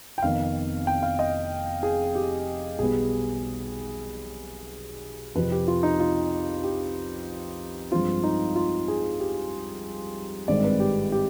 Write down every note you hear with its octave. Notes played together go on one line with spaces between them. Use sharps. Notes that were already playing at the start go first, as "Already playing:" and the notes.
G5
F1 F2 D#3 B3 F5
G5
F5
D#5
G#4
G4
B1 B2 G3 B3 G#4
F2 C3 F3 B4
G4
F4
D#4
F4
G4
G2 F3 G#3 C4 F4
D#4
F4
G#4
G4
G#1 G2 D#3 G#3 C4 D5
B4
G4
G4